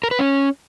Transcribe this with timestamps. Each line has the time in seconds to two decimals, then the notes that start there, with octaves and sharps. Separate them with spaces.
0.03 A#4
0.11 B4
0.19 C#4